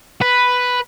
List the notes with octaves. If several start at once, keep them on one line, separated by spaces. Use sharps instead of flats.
B4